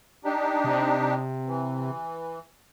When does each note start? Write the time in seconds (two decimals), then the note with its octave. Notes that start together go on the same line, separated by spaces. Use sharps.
0.25 D4 D#4 G4
0.64 C3
1.47 E3